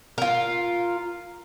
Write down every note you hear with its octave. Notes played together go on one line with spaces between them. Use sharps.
F4 A#4